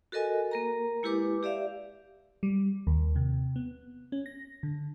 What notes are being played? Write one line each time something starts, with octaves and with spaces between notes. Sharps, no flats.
F#4 A4 A#4 D#5 G#5
A#3 A#4 A#5
G#3 E4 G4 B4 D6
G4 D5 E5 F5
G3
D#2
C3
B3
C#4
A#6
D3